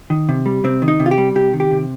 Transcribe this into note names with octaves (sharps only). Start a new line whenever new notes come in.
D#3
C3
G3
C3 C4
D#3
D#4
C3
F4
G4
G3
C3 G4
D#3
G4
C3